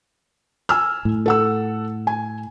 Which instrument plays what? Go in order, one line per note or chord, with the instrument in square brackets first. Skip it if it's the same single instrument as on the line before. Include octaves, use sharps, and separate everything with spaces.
[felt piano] G#5 E6 F6
[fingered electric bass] A2
[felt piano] A4 F#5 E6
G#5